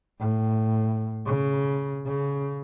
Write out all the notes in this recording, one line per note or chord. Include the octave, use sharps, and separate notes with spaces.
A2
C#3
C#3